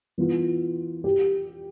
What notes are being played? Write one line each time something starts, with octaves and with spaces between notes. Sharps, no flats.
E3 B3 F4
G4